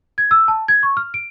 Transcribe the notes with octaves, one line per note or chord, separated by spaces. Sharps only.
G#6
E6
A5
G#6
C#6
F6
D7